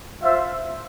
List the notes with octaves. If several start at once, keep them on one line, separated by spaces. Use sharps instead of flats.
F4 C5 E5